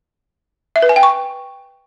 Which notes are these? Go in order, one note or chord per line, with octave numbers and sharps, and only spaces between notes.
E5
B4
G#5
G5
C#6